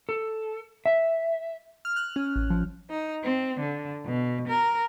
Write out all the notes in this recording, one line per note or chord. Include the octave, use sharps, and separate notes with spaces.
A4
E5
F6
F#6
C#4
A1
F3
D#4
C4
D3
B2
A#4